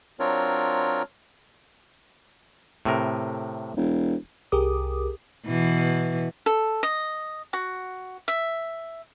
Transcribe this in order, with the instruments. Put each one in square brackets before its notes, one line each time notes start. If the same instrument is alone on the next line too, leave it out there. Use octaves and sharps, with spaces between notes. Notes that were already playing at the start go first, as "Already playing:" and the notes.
[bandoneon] F#3 C4 D4 F4 A#4 C#5
[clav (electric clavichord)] A2 C3 A#4
[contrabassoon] E1
[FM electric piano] C2 G4 G#4 A#4 D6 D#6
[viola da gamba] B2 E3
[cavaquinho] A4
D#5
F#4
E5